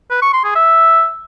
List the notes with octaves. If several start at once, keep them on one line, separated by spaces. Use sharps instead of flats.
B4
C#6
C6
G#4
E5